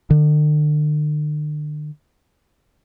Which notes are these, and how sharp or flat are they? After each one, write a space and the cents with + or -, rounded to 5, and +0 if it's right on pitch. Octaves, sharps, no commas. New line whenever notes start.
D3 +40